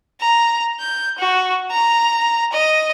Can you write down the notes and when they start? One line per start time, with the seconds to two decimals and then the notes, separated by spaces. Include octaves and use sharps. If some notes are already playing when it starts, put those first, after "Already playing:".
0.21 A#5
0.79 G6
1.18 F#4
1.71 A#5
2.52 D#5